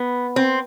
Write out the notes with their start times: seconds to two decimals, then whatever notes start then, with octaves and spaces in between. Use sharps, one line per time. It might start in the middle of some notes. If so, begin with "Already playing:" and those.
Already playing: B3
0.36 C4